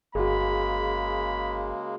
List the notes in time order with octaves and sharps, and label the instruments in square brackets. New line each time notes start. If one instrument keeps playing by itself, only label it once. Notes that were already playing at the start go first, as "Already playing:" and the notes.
[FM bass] G1 [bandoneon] C#3 G#3 A#3 [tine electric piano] F#4 G#4 [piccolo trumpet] B5